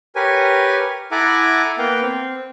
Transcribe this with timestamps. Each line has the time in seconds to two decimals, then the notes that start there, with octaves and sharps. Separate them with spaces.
0.16 G4 A#4 B4 C#5 G#5
1.11 E4 A4 F#5 G#5 A#5 D6
1.78 A#3 B3 F5 G5
2.02 C4